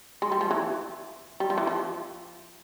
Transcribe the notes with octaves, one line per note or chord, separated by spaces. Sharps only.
G#3
G3
F3
E3
G3
F3
E3
F3